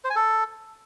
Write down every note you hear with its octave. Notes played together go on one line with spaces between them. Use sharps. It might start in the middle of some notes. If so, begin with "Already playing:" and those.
C5
G#5
A4